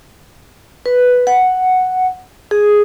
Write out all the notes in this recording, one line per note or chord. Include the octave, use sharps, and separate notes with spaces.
B4
F#5
G#4